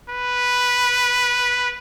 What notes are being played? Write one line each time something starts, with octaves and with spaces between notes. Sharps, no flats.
B4